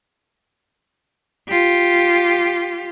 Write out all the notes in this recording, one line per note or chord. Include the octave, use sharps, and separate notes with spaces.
F4 G4